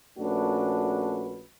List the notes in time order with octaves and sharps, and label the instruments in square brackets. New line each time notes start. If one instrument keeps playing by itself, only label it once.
[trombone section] A#1 A3 C#4 D4 F#4 B4